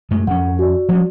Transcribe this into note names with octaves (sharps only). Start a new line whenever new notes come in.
F#2 G#3 A3
F2 C#4 F#5
F#4 D5
F3 G3 C#4